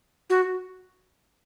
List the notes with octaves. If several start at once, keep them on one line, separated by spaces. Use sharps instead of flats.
F#4